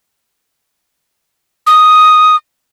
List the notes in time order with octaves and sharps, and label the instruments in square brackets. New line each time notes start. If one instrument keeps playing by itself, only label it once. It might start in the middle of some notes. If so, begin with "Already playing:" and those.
[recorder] D#6